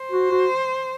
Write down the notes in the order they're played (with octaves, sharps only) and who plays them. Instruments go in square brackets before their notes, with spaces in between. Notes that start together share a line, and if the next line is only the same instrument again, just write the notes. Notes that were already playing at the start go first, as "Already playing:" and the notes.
Already playing: [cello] C5
[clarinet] F#4
F#4